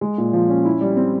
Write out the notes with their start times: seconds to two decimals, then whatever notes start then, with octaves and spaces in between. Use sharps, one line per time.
0.01 G#3
0.18 A#2
0.33 F3
0.49 C#4
0.65 E4
0.81 G3
0.97 C4